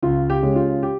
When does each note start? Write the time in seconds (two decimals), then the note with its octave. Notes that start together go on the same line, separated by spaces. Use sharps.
0.03 C#2 F4
0.30 G4
0.43 C#3 G#3
0.56 F4
0.83 G4